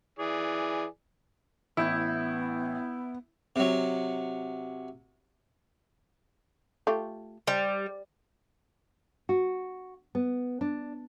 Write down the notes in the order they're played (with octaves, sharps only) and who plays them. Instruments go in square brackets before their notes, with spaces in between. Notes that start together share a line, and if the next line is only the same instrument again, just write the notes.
[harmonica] E3 G#4 D5
[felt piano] A1 [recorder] B3 [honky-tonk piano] E4 [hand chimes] D#6 G6 G#6
[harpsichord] C3 F#3
[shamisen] A3 F4 G4
[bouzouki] G3 [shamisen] C5
[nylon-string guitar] F#4
B3
D4